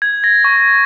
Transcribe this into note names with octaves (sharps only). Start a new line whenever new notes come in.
G#6
A#6
C#6